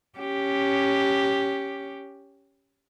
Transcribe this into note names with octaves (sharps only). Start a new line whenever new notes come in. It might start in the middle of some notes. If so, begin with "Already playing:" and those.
C#4 G4